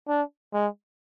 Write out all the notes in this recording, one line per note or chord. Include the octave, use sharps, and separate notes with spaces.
D4
G#3